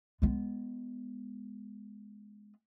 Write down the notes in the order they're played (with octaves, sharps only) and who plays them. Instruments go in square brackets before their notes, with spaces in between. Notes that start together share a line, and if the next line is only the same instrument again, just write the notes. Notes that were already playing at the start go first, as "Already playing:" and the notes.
[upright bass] G#3 B3